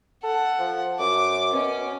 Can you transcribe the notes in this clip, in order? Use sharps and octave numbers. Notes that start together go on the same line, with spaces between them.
A4 F#5
F3
F#2 D6
B2 C#4